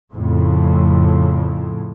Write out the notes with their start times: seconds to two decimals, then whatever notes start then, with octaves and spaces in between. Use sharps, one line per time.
0.14 F2 A2 C#3